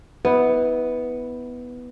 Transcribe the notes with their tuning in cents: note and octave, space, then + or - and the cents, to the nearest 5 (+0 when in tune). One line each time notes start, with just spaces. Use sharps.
B3 +0 E4 -35